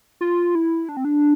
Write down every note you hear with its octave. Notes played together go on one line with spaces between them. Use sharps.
F4
E4
D4
C4
D4